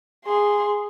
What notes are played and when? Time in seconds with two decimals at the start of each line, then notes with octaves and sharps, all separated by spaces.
0.25 G#4 C6